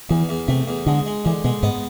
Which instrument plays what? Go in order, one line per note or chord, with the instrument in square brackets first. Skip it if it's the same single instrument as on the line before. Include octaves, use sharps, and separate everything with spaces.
[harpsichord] E2 [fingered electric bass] E3
[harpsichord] E2
[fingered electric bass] C3 [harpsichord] A3
[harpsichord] E2
[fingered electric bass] D3 [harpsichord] G#3
[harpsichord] G#3
[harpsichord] D3 [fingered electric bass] E3
[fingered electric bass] B2 [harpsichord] G#3
[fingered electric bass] G#2 [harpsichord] B3